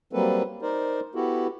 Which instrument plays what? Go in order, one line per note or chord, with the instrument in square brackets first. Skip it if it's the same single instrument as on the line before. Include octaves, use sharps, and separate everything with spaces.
[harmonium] F#3 G3 A#3 C4 A4 B4
D#4 A#4 C5 D5
B3 E4 F#4 G4 A4